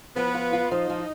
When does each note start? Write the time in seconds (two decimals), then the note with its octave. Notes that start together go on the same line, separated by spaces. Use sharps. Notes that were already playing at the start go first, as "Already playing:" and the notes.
0.16 F3 B3 B4
0.34 F4
0.53 F4
0.71 F3 D#4 D#5
0.90 F3